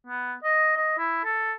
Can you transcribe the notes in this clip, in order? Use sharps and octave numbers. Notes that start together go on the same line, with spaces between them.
B3
D#5
D#5
E4
A4